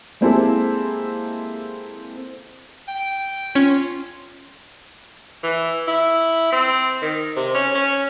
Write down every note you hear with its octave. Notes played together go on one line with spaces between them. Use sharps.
G#3 A#3 C4 E4 G4 A4
G5
C#4 F4
E3
E4
C4
D#3
C3
C#4
C#4